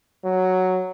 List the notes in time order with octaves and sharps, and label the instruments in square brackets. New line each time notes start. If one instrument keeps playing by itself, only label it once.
[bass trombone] F#3